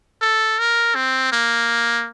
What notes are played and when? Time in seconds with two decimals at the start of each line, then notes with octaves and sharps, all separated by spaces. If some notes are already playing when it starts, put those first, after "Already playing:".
0.22 A4
0.59 A#4
0.95 C4
1.32 A#3